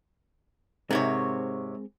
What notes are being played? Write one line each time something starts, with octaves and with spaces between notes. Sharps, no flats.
G#2 C3 G#3 C4 A#4 C#5